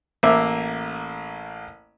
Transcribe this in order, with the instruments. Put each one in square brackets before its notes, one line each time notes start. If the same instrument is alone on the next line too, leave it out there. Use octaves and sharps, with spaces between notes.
[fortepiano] A1 A#3 E5 D6 E6